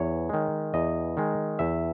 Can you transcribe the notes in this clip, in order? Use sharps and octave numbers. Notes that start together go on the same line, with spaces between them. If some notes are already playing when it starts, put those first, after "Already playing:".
Already playing: E2 C#5
D#3 G#3
E2 D#5
D#3 G#3
E2 E5